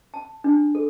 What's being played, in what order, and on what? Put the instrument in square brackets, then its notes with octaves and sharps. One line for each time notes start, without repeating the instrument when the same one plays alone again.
[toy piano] A5
D4
A4